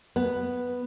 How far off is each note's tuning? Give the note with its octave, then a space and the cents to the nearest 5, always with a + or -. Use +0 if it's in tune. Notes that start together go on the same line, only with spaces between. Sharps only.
B3 +0